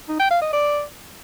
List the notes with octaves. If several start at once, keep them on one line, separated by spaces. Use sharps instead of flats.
D#4
G5
F5
D#5
D5